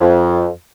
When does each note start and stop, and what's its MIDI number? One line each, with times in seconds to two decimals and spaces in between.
0.01 0.48 41